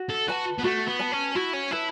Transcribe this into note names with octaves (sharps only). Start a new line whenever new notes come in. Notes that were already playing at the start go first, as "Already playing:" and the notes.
Already playing: F#4
A4
F#4 B4 A5
B3
A3 F#4
B3
B4 A5
C#4
E4 F#4
C#4
E4 B4 A5